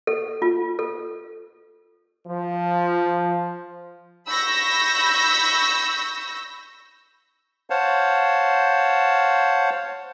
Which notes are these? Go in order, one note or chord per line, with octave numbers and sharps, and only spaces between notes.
A4
F4
A4
F3
B5 C#6 E6 G6 A#6
C5 C#5 F5 F#5 A5